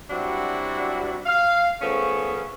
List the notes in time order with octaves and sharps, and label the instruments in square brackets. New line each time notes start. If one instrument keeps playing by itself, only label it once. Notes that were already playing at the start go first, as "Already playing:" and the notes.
[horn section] F#3 G3 C4 D4 E4 F#4
F5
F3 A3 B3 C#4 G#4